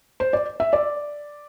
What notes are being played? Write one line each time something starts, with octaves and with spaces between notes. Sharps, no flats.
C5
D5
E5
D5